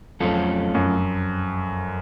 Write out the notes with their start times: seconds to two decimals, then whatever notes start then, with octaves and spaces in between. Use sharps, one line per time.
0.20 F2 F#3 A3 C#4 F4 A4
0.74 F#2